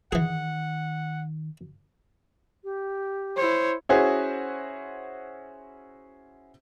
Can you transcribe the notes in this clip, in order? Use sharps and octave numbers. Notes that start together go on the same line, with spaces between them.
D#3 E3 G#4 F#5
G4
E4 C5 C#5
C#4 E4 F#4 G#4 C5